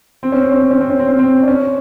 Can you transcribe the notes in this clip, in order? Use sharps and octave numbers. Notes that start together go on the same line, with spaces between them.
C4
C#4
C4
C#4
C4
C#4
C4
C#4
C4
C#4
C4
D4
C#4